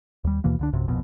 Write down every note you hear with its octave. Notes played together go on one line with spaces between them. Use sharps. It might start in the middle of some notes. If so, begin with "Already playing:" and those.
D#2 G3
D#2 B2 E3 A#3
C#2 D3 D4
A#1 F#2 C3
D1 A#1 F2 B2